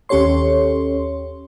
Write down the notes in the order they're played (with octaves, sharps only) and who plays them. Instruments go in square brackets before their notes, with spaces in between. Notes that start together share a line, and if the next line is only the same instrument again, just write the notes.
[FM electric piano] D#2 C#4 G4 A4 C#5 C6